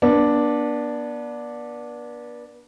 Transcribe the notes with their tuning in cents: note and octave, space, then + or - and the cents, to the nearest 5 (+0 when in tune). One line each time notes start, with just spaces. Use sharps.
B3 -40 D4 +0